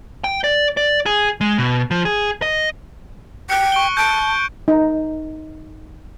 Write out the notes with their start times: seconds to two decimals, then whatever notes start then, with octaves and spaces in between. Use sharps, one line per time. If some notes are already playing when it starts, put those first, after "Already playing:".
0.24 G5
0.44 D5
0.77 D5
1.06 G#4
1.41 G#3
1.58 B2
1.91 F3
2.05 G#4
2.42 D#5
3.50 G5 F#6 C#7
3.72 C#6 D7 G7
3.97 A5 G6 D7
4.68 D#4